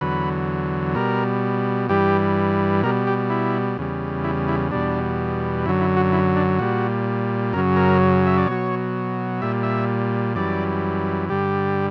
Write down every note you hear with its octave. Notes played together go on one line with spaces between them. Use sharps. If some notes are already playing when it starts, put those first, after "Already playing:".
E2 D3 F#3 B4
B2 G3 A#4
G2 E3 G3 G4
B2 G3 A#4
G4
E4
E2 C#3 G3
E4
E4
E2 B2 G3 D4
F#2 D3 F#3 E4
E4
F#4
E4
D4
A#2 G3 F#4
F#2 C#3 F#3 A#4
A#4
E5
D5
B2 F#3 C#5
A#2 G3 E5
E5
F#2 E3 G3 D5
G2 D3 G3 G4